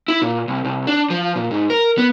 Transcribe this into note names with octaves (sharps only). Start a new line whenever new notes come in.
E4
A#2
C2
C2
D4
F3
A#2
G#2
A#4
B3